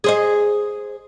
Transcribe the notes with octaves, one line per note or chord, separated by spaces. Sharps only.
G#4 C5 D#5